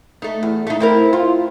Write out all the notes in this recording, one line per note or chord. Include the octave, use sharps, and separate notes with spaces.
A3 D#4
E2
A3 D#4
C4 E4 A#4
F4